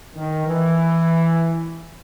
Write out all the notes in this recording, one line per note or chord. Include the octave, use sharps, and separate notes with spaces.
D#3
E3